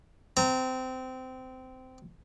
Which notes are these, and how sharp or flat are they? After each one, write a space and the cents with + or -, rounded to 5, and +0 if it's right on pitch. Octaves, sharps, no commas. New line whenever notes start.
C4 -20 A#5 +0